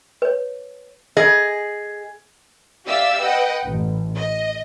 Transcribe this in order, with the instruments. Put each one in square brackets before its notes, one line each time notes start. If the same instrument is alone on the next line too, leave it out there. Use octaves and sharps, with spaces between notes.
[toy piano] B4 C#5
[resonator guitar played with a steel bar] G#4 D#5
[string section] G4 D5 E5 F5 E6
B4 D#5 F#5 G5
A1
D#5